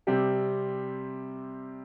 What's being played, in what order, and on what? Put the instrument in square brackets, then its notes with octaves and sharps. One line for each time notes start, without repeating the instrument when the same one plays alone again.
[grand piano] C3 G3 C4